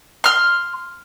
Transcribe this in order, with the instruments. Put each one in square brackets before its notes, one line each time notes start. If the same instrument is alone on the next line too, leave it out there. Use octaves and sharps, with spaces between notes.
[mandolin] C6 F6